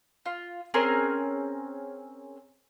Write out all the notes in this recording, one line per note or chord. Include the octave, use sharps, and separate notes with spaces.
F4
C4 C#4 G#4 A#4